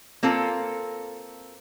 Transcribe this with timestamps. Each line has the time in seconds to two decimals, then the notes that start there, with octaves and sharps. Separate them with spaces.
0.23 A#3 C4 F4 A4